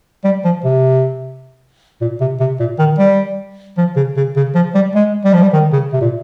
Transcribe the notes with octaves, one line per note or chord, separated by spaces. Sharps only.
G3
F3
C3
A#2
C3
C3
A#2
D#3
G3
F3
C#3
C#3
C#3
F3
G3
G#3
G3
F3
G3
D#3
C#3
C3
A#2